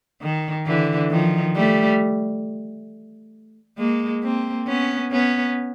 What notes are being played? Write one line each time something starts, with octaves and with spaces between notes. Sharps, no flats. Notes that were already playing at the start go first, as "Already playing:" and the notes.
D#3
D3 E3
D#3 F3
G3 A3
G#3 A#3
A#3 C4
B3 C#4
B3 C#4